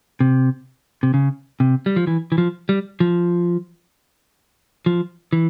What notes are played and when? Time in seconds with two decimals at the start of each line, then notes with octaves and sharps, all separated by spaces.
0.20 C3
1.03 C3
1.14 C#3
1.60 C3
1.86 G3
1.96 F3
2.07 E3
2.32 E3
2.38 F3
2.69 G3
3.00 F3
4.86 F3
5.33 E3